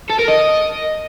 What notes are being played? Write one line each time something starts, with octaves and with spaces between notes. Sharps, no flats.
A4
A#4
D#5